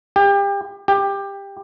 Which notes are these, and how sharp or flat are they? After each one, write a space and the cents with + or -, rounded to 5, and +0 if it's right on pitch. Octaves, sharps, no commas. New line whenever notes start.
G4 +30
G4 +15